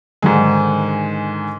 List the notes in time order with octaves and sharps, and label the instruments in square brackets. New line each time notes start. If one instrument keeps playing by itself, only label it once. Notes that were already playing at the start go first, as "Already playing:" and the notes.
[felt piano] G#2 D3 D#3 G#3